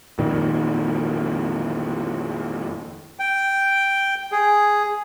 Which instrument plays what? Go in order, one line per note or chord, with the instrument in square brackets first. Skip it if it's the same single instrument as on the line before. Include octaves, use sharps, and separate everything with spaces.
[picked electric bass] F2 A#2 D#3
[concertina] G5
G#4